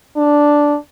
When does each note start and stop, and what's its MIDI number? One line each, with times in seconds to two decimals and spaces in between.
0.17 0.76 62